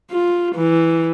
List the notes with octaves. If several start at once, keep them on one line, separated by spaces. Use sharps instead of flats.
F4
E3